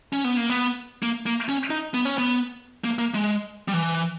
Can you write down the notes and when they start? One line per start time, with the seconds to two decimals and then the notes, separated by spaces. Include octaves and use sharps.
0.13 C#4
0.24 B3
0.37 A#3
0.50 B3
1.03 A#3
1.26 A#3
1.49 C#4
1.70 D#4
1.94 B3
2.05 C#4
2.18 B3
2.84 A#3
2.99 A#3
3.14 G#3
3.68 G3
3.73 E3